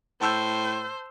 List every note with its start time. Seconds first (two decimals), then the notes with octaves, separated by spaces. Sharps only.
0.21 A2 C5 A5 E6 G6